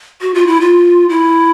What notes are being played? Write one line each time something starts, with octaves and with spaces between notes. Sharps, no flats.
F#4
F4
E4
F4
E4